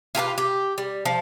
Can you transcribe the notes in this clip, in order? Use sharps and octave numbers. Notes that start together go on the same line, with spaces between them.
F4 G4 A4 B4
G4
G3
F3